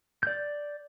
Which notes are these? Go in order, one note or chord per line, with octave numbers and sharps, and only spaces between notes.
D5 G6